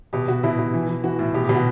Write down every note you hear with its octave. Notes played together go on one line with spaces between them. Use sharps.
B2 G4
B2 F#4
B2 E4
B2
E3
E3
E3 F#4
A2
B2 G4
G4
B2
F#4